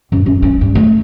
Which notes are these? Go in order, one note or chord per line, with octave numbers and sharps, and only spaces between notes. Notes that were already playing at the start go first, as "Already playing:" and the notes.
F#2
F#2
C#4
G2
A3